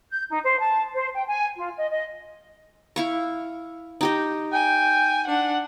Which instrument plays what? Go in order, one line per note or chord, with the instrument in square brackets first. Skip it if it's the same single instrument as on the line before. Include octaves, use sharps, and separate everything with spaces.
[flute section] G6
D#4
C5
A5
C5
G5
G#5
F4
D#5
D#5
[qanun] E4 F5 C#6
D#4 G4 D#5
[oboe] G5 [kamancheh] G#5
[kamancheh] D4 F#5